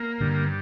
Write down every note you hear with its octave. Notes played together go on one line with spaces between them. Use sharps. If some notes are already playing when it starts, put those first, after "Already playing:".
Already playing: A#3
G2 D3